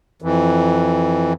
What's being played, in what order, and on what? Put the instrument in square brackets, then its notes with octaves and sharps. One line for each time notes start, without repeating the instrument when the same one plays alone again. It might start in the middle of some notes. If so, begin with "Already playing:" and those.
[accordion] F2 E3